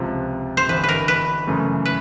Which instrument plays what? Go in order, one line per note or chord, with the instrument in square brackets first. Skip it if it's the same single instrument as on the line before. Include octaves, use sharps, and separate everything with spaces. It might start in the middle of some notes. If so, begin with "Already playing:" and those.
Already playing: [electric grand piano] C#2 C3 F3
[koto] C5
[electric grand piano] G1 G2 E3 [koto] B4
[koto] B4
A#4
B4
[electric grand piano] F#2 C#3 E3 A3
[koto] B4